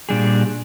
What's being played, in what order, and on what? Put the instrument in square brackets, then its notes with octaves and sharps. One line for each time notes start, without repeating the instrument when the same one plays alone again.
[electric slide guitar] A#2 G3 D4 G#4